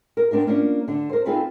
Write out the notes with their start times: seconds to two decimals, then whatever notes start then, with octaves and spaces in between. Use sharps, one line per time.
0.17 A#4
0.31 B3 C4 D4 F4 A#4
0.47 A#3 C#4 D4 F4
0.88 D3 D4
1.09 A#4 C5
1.26 C4 D#4 F4 G#4 A4 B4